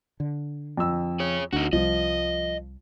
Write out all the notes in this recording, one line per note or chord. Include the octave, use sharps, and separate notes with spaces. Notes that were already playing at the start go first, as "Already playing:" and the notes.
D3
F2 E6
G#4 C#5
D2 D4 D#4 F#4
C2 F3 G3 D#5